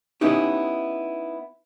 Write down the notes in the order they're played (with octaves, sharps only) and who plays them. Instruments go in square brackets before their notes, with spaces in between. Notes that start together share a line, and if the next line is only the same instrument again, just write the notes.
[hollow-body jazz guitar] B3 C#4 D#4 E4 G4